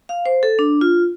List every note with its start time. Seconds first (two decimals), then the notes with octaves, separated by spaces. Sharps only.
0.09 F5
0.26 C5
0.43 A4
0.59 D4
0.81 F4